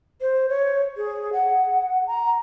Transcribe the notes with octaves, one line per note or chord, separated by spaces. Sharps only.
C5
C#5
G#4
F#5
A#5